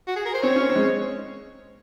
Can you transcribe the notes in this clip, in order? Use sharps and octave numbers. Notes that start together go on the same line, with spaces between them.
F#4
G#4
A#4
C5
C4 C#5
C#4
C4
G#3